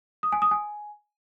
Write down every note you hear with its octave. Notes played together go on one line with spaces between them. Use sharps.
D#6
G#5
D#6
G#5